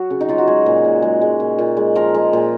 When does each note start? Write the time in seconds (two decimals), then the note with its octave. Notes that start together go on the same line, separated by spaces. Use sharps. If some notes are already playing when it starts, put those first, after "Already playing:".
Already playing: F#3 F#4
0.10 C#3
0.21 D#4
0.29 F#3 F4
0.38 F#4
0.47 G#3 G#4
0.66 A#2
0.84 A#2
1.02 G#3
1.21 G#3
1.40 A#2
1.58 A#2
1.77 G#3
1.95 F3 A#4
2.14 G#3
2.33 A#2